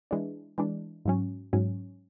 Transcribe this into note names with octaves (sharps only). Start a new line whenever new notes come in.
E3 G#3 D4
E3 G#3 D4
G#2 F#3 C#4
G#2 F#3 C#4